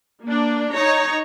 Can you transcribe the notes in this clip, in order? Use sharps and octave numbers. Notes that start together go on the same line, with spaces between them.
A#3 D4
D#4 C#5 A#5